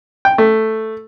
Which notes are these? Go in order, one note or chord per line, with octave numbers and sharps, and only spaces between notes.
G5
A3